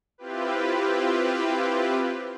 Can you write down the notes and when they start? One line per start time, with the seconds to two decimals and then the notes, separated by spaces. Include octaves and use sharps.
0.18 C4 E4 F4 G4 B4